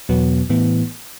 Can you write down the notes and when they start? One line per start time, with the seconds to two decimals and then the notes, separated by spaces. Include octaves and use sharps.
0.09 E2 B2 F#3 B3
0.50 A2 E3 B3